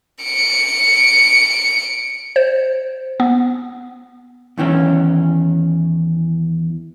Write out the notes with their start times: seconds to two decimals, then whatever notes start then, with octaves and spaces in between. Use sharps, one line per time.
0.23 C#7 D7
2.36 C5
3.20 B3
4.58 E2 D#3 E3 C#4